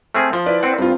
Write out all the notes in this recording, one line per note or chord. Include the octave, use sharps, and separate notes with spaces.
A3 C4 G#4 F6
F3
E4 B4 D5
C4 F#5
G2 C4 F4